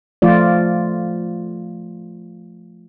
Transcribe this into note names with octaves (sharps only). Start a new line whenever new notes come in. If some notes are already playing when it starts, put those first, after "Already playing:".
F3 A3 F4 D5